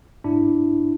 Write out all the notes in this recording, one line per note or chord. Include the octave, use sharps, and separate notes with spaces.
G#2 D4 E4